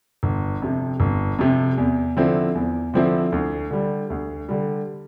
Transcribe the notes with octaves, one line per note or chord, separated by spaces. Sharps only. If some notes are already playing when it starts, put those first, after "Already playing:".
G1
F2 C3
G1
F2 C3
E2
D3 F3 C4 E4
E2
D3 F3 C4 E4
D2
D3 G3
D2
D3 G3